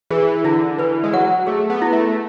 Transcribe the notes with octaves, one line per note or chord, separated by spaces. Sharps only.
E3 G#4
D3 E4
E3 B4
G#3
F#3 F#5
A3 G#4
B3
E4
A3